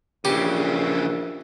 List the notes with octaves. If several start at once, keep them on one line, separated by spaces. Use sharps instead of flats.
A#1 C#3 E3 G4